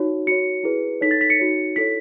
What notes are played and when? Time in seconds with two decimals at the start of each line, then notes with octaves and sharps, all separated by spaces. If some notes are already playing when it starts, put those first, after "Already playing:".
Already playing: D#4 F#4 C#5
0.27 F#4 C#5 C#7
0.64 E4 G#4 B4
1.01 D#4 A4 C#5 B6
1.11 A6
1.21 B6
1.30 C#7
1.39 D#4 F#4 C#5
1.76 E4 A4 C#5 B6